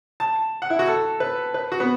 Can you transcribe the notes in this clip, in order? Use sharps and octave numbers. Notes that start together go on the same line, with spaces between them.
A5
F#5
E4
F#4
A4
B4
B4
F#4
B3